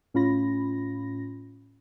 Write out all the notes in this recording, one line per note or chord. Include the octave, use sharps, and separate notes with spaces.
A2 C#4 F4 B5 A#6